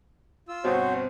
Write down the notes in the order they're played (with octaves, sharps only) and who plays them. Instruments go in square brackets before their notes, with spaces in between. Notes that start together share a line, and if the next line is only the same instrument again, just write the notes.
[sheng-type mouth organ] F4 E6
[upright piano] G1 B2 C4 [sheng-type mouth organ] F#4 C5 C#5